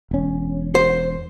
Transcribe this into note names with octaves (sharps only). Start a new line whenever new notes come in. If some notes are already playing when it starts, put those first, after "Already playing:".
E1 C#4
C5